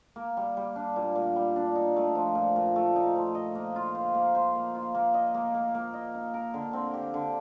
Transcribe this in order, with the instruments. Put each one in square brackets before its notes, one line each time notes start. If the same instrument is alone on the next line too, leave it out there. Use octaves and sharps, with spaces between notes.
[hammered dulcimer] A#3
G3
G3
D4
A#2
A#2
G3
D4
D#4
A3
F3
A#2
A#2
A3
D#4
F3
D#5
A#3
F4
C5
A#3
C5
A#3
F4
A#3
D#5
A#3
A#3
A#3
D#5
D#4
A#4
D3
C4
G4
D3